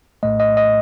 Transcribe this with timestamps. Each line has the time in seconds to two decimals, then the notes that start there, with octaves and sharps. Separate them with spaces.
0.23 A#1 A2 A3 D#5
0.40 D#5
0.57 D#5